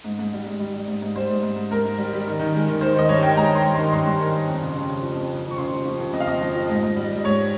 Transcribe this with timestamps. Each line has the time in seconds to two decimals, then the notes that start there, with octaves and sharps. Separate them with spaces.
0.04 G#2
0.19 G#2
0.33 G3
0.47 G#2
0.60 G3
0.74 G3
0.88 G#2
1.02 G#2
1.15 G3 C5
1.30 G#2
1.43 G#2
1.56 G#2
1.71 G#2 A#4
1.85 G#2
1.98 G3
2.13 G3
2.27 D#3
2.40 D#3
2.55 G#3
2.68 D#3
2.81 D#3 C5
2.96 D#3 D#5
3.09 G2 C#5
3.23 D#3 G5
3.36 G#3 A#5
3.50 D#3 C6
3.64 G2
3.74 D#3 C6
3.92 G2 C6
4.05 G2
4.19 D#3
4.34 G2
4.48 F2
4.62 C#3
4.75 C#3
4.89 C#3
5.02 F3
5.16 F2
5.31 C#3
5.45 F3
5.51 C#6
5.58 C#3 C6
5.72 F3
5.85 F3
6.00 C#3
6.13 F2 D#5
6.20 F5
6.27 F2 D#5
6.41 F3
6.55 F3
6.69 G#2
6.83 G#2
6.96 G3
7.10 G3
7.24 G#2 C#5